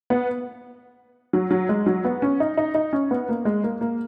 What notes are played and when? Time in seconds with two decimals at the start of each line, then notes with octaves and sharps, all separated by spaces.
0.10 B3
1.33 F#3
1.51 F#3
1.69 G#3
1.86 F#3
2.05 B3
2.22 C#4
2.40 D#4
2.57 D#4
2.75 D#4
2.93 C#4
3.11 B3
3.29 A#3
3.45 G#3
3.64 A#3
3.81 A#3